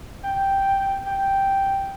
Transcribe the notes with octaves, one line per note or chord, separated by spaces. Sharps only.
G5
G5